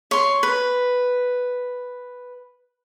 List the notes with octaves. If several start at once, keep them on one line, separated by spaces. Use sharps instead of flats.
C#5 C6
B4